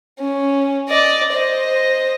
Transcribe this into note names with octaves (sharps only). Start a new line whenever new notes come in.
C#4
D5 D#5
C5 D#5